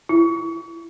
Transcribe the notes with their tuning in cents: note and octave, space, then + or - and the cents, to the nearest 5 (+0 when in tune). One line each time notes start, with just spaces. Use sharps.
E4 +25